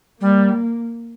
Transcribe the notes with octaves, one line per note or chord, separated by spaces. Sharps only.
G3 A#3